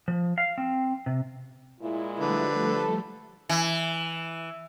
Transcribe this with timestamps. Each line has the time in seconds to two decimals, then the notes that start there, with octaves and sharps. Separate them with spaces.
0.08 F3
0.38 F5
0.58 C4
1.06 C3
1.81 A#2 G#3 E4
2.19 D3 F3 G3 A3 B4
2.64 A4
3.49 E3